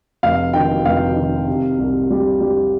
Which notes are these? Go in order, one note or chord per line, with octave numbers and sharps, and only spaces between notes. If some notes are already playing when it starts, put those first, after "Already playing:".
F1 F5
D#3 G5
F1 F5
D#3
C3
C2
G3
G3